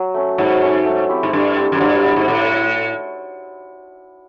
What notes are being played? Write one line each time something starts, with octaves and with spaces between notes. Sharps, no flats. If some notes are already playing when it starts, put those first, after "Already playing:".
Already playing: F#3
A3 C#4
G#2 F#3
A3 C#4
A3
C4 E4 G4
G#2
G2 A3
C4 E4 G4
F#2
G2 F#3
B3 E4 A4
G#2
A2 F#3